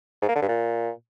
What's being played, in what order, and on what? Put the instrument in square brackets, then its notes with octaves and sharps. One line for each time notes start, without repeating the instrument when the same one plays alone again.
[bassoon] G#2
A#3
D3
G2
A#2